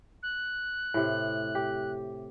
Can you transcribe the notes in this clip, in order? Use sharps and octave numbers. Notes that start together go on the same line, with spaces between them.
F#6
A2 C3
G4